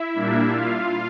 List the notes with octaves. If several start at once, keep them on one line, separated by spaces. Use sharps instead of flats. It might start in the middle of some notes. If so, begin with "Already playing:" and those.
Already playing: E4 E5
A#2 G3 A#3 D4
F4 F5